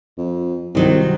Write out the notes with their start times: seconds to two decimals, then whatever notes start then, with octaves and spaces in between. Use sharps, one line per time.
0.18 F2
0.75 C2 C3 D#3 F#3